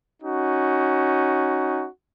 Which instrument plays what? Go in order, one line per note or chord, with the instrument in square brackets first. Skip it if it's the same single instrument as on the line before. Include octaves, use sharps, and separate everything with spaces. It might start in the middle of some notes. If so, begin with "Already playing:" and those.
[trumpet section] C#4 D#4 F#4